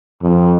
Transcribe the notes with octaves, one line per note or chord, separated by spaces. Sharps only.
F2